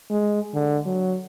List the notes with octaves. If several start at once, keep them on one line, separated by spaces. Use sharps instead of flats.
G#3
D3
F#3